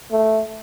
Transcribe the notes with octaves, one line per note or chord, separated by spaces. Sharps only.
A3